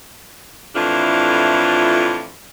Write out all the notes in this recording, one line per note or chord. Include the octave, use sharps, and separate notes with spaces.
F2 A2 E3 D4 F4